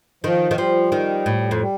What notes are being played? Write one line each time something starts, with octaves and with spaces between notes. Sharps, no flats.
D#3 F3
D#3
F3 G3
D#3
A2
F2
G3